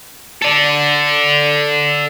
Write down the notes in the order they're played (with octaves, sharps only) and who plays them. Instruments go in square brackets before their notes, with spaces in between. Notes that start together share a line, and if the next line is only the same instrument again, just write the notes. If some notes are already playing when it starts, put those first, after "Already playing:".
[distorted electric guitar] A4 D5